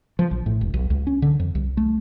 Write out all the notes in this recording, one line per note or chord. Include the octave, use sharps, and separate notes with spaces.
F3
A#1
A2
E1
B1
C#2
C#4
D3
F2
C2
A3